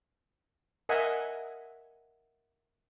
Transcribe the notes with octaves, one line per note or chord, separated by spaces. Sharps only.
A#4 D#5 E5 F#5 G#5